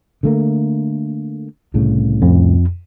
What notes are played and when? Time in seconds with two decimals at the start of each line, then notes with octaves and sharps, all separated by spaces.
0.23 D3 A3 A#3
1.74 C2 A2 C#3
2.22 F2